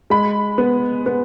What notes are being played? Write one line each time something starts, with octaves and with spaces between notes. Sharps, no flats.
G#3 B5
B3
B3